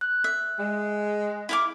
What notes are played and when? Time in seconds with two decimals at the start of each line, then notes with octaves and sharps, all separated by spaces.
0.01 F#6
0.24 E5
0.59 G#3
1.49 E4 F5 D6